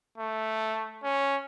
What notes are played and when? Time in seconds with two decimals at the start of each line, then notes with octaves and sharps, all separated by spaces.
0.18 A3
1.04 C#4